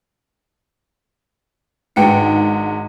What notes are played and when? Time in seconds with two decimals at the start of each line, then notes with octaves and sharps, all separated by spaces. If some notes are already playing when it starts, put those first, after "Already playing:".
1.96 G#1 G#2 D4 B4 G5 C#7